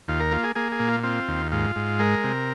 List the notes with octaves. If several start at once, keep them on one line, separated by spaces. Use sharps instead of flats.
D#2 F4
A#4
A#3 F4
G#4
A#3 G#4
G#4
A#2
F4
C4 F4
D#2
G#2 F4
G#2
G#3 A#4
C3